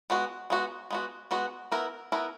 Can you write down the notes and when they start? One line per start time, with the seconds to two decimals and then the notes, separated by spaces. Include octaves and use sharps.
0.10 G#3 B3 F#4
0.50 G#3 B3 F#4
0.91 G#3 B3 F#4
1.31 G#3 B3 F#4
1.72 B3 E4 A#4
2.12 B3 E4 A#4